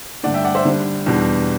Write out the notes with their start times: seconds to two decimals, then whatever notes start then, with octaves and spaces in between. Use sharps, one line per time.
0.23 G2 D3 A3 D4 D5 F#5
0.34 E5 G5
0.44 D5 F#5
0.55 C5 E5
0.65 D3 G3 D4
1.06 E2 B2 G3 D4